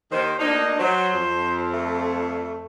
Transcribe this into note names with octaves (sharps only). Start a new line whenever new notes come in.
D#2 D#3 C5
D2 A#3 D4 D#4
F#3 C5
F2
A3